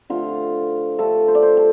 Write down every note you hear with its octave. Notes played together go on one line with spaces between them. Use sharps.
D3 F3 A3 F4
D3 F3 A3 A4
C5
D5
C5
A4